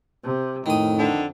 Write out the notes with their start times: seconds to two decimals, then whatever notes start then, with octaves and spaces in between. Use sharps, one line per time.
0.23 C3
0.66 F2 A2 D#3 D#6
0.98 D3